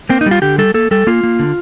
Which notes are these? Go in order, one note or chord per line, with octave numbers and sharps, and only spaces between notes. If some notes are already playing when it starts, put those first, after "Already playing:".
A#3 C4
D#4
G3
F4
D3 G4
G3 A4
A#3 A4
G3 A4
A#3 F4
A#3
D3